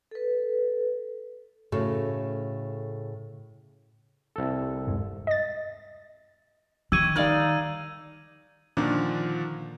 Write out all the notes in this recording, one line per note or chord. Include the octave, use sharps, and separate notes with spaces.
A4 B4
A2 C#3 F#4 A4
C2 A4
D#1 G2 G#3
D#5 A6
A#1 D#3 G4 C#6 E6 G#6 D#7
G3 D#4 A#4 D5 F5
A#2 D3 D#3 F3 A#3 D4